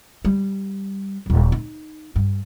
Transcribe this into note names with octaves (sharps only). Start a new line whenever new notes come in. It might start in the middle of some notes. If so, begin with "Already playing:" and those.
G3
D#1 B1
D#4
G2